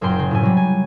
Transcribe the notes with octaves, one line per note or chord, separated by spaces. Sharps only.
F#1 F#2 A#2 G5 C6
C#3
A2 C3 G#5
F#3 G3
G#5